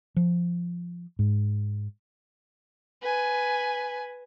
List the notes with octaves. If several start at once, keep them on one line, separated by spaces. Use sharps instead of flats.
F3
G#2
B4 G#5